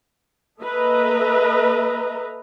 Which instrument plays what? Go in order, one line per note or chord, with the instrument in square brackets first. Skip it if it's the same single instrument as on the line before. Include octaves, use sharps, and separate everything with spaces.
[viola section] A#3 A4 B4 D#5 E5 A#5